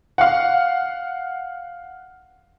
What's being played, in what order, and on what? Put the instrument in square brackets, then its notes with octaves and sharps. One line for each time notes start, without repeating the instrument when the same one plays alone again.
[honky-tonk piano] F5 F#5